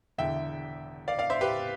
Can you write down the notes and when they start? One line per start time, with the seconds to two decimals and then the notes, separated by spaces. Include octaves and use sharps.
0.18 E1 E2 D3 E5 G5
1.08 D5 F5
1.19 D5 F5
1.30 C5 E5
1.41 G4 B4